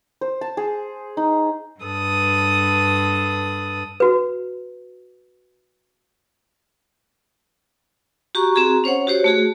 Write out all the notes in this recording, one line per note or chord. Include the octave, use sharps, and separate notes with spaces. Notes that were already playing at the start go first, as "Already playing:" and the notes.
C5
A5
G#4
D#4
G2 A4 B4 D#6
F#4 B4
F#4 G4 A#5 C#6
C4 F#4 G#4 A#5
C#4 C5 C#5 F#5
F#4 G4 C5 C#5
A3 F#4 G#4